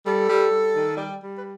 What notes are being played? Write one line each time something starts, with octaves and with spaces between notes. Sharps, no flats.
G3 A4
G3
G3
D#3
G3
G3
B4